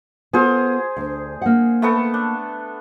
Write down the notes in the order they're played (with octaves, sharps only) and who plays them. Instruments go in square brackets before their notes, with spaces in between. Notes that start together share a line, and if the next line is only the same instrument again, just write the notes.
[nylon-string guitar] B3 F4 A4 [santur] G#4 C5
[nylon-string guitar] D2
A#3 F#5
[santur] A3 B3 A4
D4